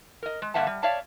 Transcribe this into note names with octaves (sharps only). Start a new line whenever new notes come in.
A#4 D#5
G#3
G2 D3 A#3 E5 F#5 A5
G3
C#5 D5 E5 F5 A5